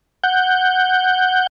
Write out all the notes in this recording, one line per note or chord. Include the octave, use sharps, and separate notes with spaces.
F#5 G6